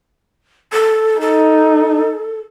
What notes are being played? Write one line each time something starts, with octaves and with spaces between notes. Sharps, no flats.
A4
D#4 A4